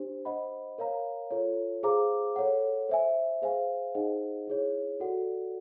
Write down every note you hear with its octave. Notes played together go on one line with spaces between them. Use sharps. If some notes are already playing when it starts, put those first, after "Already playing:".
Already playing: D4 G4 C5
C5 D#5 F#5 B5
A#4 C#5 F5 A#5
F4 A4 C#5
G#4 C5 F5 A#5 D6
A4 C#5 F#5
C5 E5 G#5
G#4 C5 F5 G#5
D#4 G#4 C5 D#5 F#5
E4 G#4 C#5
F#4 A4 D5 F#5